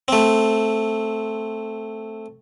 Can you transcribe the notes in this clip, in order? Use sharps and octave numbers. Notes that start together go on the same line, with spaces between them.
A3 C4